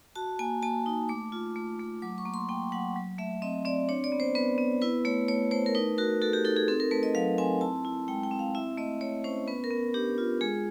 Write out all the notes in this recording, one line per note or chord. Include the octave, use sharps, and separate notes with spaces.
F#4 A5
A#3 G#5
A#3 A5
D#4
A3 D6
F4
A3
A3
F#3 D6
C#6
A#3
C6
A#3 G5
F#3 F#5
F#3
A3 E5
C4 D#5
C4 D5
D4 C#5
D5
B3
C5
B3 B4
B3
E4 B4
A3 C#5
A3 C#5
A3 C5
A#4
D#4 B4
F#4 A#4
F#4 A4
G4
D#4 A4
G#4
C4 A4
A#4
A3 B4
D#5
F#3 F5
C4 G#5
E4 A5
E4
G#3 G5
G5
C4
F5
E4 E5
A3 D#5
A3 C#5
C#4 C5
B3 B4
A#4
B3
D4 G4
F4
G#3 G#4